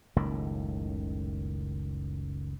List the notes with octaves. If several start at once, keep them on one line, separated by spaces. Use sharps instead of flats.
F#1 C#2 A2 D#3